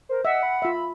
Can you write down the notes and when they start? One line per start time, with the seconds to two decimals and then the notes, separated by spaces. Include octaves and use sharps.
0.09 A#4 C5
0.25 D#5 E5 F#5
0.43 B5
0.62 F4 E5